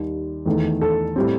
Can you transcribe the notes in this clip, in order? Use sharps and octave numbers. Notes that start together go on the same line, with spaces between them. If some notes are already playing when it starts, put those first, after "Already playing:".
Already playing: D#2 D#3 G3
E2 D#3 A3
A4
A2 G3 C4